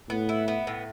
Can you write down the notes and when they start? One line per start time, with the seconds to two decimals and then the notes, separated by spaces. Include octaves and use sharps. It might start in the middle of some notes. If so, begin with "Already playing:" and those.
0.10 A2 B3
0.29 E4
0.48 B3
0.67 A2